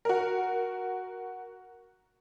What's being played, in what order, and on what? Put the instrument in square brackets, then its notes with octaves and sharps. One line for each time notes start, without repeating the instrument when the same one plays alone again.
[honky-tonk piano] F#4 A#4